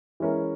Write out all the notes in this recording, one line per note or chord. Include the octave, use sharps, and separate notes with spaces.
E3 G#3 C#4 E4 A#4